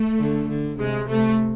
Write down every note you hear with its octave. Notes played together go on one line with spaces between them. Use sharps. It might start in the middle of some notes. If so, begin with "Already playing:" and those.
Already playing: A3
D3
D3
C3 G#3
C3 A3